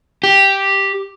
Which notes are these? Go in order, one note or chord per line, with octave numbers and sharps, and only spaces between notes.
G4